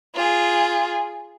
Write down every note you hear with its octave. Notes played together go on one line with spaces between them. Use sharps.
F4 G#4